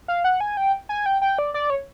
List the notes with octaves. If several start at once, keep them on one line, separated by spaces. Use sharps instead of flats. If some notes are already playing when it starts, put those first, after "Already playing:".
F5
F#5
G#5
G5
G#5
G5
G5
D5
D5
C#5